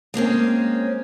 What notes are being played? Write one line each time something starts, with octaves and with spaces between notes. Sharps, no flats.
G#3 A#3 C4 C#4